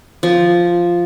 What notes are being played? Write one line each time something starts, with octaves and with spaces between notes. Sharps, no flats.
F3